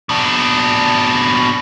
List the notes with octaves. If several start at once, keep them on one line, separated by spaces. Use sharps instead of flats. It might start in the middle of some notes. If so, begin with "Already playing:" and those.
B2 D4